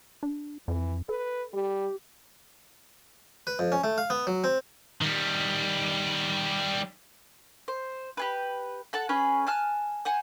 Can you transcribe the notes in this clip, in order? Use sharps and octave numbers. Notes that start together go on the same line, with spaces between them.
D4
F2 E3
A4 B4
G3 G4
B4
F2
C#4
A3
F5
B3
F#3
C4
D#3 G3
C5
G4 G#4 B4
A4 F#5 A5
C#4 G#4 B4
G#5 A5 F6 F#6
C5 F#5 G#5